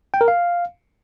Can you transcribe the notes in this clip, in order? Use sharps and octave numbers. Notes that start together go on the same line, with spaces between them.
G5
A#4
F5